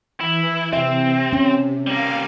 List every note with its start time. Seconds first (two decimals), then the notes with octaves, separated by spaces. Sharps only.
0.20 E3 E4
0.73 C3 C4 E5
1.33 C#4
1.87 G3 A#3 F5